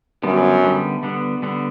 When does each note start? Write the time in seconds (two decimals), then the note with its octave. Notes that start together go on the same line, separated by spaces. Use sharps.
0.23 F#2 D3 G3 B3
0.64 D3 G3 B3
1.03 D3 G3 B3
1.42 D3 G3 B3